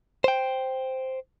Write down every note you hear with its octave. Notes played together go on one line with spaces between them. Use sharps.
C5 G5